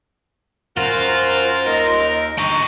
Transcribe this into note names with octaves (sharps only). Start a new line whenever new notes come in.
F#2 F4 F#4 A#4 C5
D#2 A#4 D#5
G5 A#5 C#6